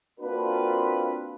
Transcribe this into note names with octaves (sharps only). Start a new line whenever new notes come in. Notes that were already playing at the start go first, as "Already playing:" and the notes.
A#3 C4 D4 F4 F#4 B4